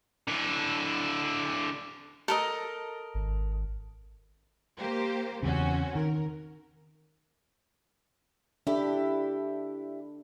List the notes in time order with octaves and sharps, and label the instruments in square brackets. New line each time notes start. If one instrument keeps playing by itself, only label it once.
[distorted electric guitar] D3 E4
[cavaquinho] A4 A#4 D#5
[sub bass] G#1
[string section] A#3 G4 C5
[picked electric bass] E2 C#3 [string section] C4 C#4 F#4
[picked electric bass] D#3 [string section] A#4
[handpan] D4 A4 [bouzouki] E4 G4